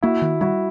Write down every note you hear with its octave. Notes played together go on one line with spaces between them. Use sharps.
A#3 E4 F#4
D#3
G3 E4 F#4